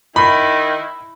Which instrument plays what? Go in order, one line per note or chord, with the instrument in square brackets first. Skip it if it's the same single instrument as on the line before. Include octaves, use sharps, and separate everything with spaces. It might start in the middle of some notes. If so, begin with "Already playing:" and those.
[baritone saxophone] D#3 [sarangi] E4 [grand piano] B5